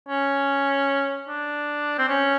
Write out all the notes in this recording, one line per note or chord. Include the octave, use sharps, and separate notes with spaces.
C#4
D4
C4
C#4